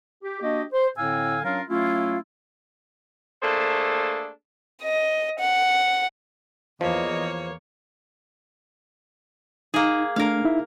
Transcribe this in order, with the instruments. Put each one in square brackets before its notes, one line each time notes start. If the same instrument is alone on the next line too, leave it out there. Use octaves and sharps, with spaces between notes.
[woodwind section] G4
A#3 D4 F#4 G4 D#5
C5
A2 D3 C4 F5 G#5 E6
F#3 C#4 D4 F4 A#4 F5
F#3 A3 C#4 E4 F4
[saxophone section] A3 A#3 D4 G#4 A4 C5
[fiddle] D#5
F#5
[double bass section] E2 [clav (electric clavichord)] F3 [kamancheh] A#3 C#5 [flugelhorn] D#5
[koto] A#3 G#4 [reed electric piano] D#4
[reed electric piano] A3 D4 [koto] A#4 F5
[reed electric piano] D#4 E4 E5